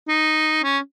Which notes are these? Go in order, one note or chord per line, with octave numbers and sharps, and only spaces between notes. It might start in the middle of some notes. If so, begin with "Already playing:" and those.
D#4
C#4